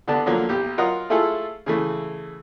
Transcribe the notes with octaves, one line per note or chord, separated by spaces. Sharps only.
D3 B3 D4 A5
D3 F3 F#3 A#3
B1 G4
F#3 F4 A#4 D#5 F#5
A3 E4 F4 G#4 A4
C#3 E3 A3